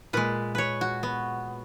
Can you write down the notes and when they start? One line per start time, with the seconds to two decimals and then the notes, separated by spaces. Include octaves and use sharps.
0.13 A#2 G#3 B4
0.55 B4 C#5
0.81 F#4
1.03 B3